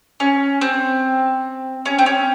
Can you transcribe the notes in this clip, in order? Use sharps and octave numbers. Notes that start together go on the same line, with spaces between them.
C#4
C4
C#4
C4
C#4